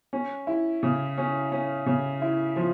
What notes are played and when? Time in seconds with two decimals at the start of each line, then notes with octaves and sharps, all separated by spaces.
0.13 C#4
0.47 E4
0.83 C#3
1.18 C#4
1.52 C#4
1.86 C#3
2.22 E4
2.56 F3